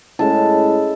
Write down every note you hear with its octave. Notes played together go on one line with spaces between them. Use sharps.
A2 G#3 C#4 E4 A5